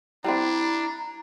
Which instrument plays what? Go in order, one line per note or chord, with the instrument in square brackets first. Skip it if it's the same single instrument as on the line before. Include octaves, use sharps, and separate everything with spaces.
[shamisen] G3 C4 [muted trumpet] D4 [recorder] E4 [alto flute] A#5